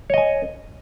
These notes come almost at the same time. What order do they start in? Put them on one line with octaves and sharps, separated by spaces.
C#5 D#5 G#5